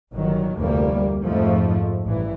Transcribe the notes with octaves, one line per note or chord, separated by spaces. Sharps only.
G1 D#3 F#3
F1 D2 G3 A#3
F2 G#2 F3 A3
A1 G2 E3